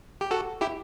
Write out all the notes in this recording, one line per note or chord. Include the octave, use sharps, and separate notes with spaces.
G4
F#4 A4
E4 G4